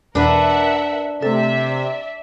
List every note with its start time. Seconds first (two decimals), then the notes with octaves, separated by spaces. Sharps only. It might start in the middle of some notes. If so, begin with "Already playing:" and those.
0.15 E2 B2 E3 D4 A#4 B4 E5 F#5
1.22 C3 A3 A4 D5 E5